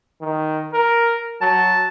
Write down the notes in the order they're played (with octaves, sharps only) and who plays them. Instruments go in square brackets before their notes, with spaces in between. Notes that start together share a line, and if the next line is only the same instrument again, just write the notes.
[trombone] D#3
A#4
[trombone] F#3 [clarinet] A5